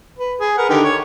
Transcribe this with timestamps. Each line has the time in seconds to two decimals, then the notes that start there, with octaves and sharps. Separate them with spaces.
0.19 B4
0.40 G#4
0.58 A#4 B4 F#5
0.69 D3 D#3 G4
0.84 C#5